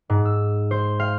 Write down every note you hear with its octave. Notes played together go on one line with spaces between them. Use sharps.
G#2
E6
C5
F5